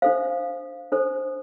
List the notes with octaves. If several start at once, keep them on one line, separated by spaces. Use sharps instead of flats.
D4 A4 C5 F5
D4 A4 C5